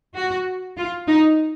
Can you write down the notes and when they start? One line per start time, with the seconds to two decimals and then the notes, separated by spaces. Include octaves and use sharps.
0.15 F#4
0.77 F4
1.08 D#4